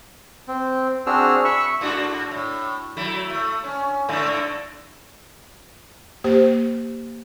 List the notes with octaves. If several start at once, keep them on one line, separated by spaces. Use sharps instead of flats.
C4
C4 D4 F#4 G#4 E6 F6
E5 B5 C#6 E6
G#2 D4 F#4
A2
F#3 A3 E4
A3
C#4
G#2 D3 A3
A#3 G4 C5